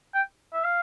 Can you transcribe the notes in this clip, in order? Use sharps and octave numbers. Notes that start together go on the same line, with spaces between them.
G5
E5
F5